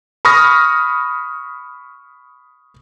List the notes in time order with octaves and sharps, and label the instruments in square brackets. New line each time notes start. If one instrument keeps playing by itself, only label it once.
[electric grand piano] B5 C#6 D#6 F6 A#6